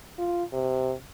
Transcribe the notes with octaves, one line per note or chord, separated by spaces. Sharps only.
F4
C3